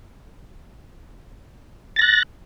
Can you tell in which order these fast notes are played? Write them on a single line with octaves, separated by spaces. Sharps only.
A6 A#6 F#6